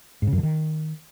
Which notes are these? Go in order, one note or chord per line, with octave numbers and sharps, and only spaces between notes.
G#2
C#3
F#2
D3
D#3